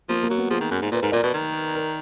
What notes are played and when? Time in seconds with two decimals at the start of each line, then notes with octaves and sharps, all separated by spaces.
0.09 F3 A#3
0.23 A#3
0.30 F#3
0.37 B3
0.50 F3 G#4
0.61 D#3
0.71 F#2
0.82 G#2
0.92 A#2 B4
1.02 G#2 A#4
1.12 A#2 D5
1.23 B2 B4
1.34 D#3
1.75 A#4